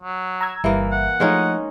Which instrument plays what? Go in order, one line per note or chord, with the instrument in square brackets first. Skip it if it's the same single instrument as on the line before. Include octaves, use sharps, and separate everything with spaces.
[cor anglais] F#3
[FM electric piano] A#5 E6 G#6
[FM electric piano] G1 G3 E5 [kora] E3 A#3
[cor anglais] F#5
[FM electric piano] F3 A3 F4 [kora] G#3 C#4 D#4